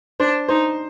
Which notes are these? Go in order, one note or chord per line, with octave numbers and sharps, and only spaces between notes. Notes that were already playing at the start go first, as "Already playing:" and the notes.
D4 C5
D#4 C5